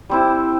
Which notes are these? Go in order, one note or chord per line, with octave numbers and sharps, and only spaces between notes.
G3 C4 E4